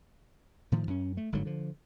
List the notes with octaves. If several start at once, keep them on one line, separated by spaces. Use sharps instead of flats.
A2 D#3 F3
F#2 C#4
A3
G1 G#2 D3 F#3
D3 F3